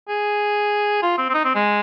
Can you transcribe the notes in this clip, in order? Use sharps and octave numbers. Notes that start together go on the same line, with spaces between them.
G#4
F4
C4
C4
D#4
C4
G#3